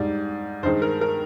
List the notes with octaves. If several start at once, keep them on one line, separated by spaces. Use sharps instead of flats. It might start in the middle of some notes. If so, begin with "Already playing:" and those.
Already playing: G#2 G3 D5
G2 D#3 G#3 C5
A#4
A#4